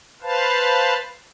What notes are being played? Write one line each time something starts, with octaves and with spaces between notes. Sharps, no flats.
B4 C5 F5 A5